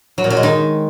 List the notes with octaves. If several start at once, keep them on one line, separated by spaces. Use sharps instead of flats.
F#3
A#2
F#3
G#3
D#3